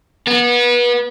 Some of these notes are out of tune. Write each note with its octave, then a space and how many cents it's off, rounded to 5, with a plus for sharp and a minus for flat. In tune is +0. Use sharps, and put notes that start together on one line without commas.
B3 -30